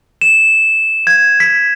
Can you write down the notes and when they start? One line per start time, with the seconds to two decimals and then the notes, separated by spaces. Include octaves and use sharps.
0.21 E7
1.07 G#6
1.40 B6